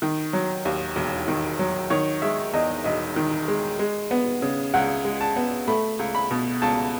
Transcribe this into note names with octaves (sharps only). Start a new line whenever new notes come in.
D#3
F#3
D#2
E1
D#3
F#3
D#3 C#5
G#3 E5
E2 D#5
E1 D#5
D#3
G#3
G#3
B3
C#3
C#2 F#5
G#3
A5
B3
A3 B5
C#2
B5
B2
C#2 A5